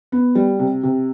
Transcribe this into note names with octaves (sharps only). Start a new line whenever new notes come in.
B3
G3
C3
C3